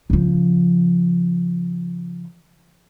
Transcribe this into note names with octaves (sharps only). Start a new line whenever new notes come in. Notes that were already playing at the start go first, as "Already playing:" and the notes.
C#3 F3